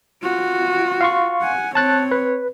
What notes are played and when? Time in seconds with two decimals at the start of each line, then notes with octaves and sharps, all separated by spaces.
0.23 F4 F#4
1.01 F5 C6 C#6
1.41 F#5 G#5
1.75 C4 C#5 A5 F#6 A6
2.11 B4